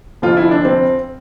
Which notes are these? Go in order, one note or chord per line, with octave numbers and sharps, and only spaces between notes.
F1 F2 D3 F3 F4
E4
D4
C4